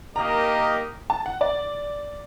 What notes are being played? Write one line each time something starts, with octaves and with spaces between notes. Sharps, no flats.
A#3 D#4 G4 A#4 D#5 A#5
A5
F#5
D5